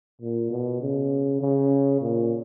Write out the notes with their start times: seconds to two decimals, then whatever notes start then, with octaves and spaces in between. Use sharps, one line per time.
0.21 A#2
0.51 B2
0.81 C#3
1.41 C#3
2.01 A#2